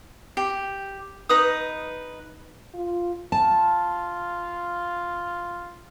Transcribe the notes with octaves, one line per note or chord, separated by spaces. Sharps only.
G4
D#4 B4 D#6
F4
F4 A5